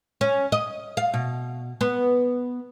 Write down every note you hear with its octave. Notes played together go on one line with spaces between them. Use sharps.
C#4
D#5
F5
B2
B3